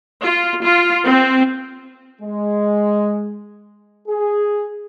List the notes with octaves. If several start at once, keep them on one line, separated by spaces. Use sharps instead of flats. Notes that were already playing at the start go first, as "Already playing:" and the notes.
F4
F4
C4
G#3
G#4